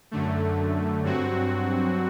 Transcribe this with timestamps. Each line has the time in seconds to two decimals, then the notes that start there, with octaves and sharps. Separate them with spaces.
0.11 F#2 D3 A3
1.04 G2 F#3 C4 F#4